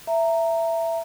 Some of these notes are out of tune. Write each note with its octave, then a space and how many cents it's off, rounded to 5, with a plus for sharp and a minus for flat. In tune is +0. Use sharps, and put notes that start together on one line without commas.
E5 +10 A#5 -15